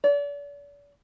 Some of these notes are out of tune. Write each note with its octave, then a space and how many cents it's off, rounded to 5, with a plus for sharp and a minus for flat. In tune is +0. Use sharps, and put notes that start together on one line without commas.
D5 -40